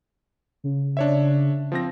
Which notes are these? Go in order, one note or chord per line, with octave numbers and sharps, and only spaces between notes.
C#3
D4 C#5 E5
F3 C4 A#6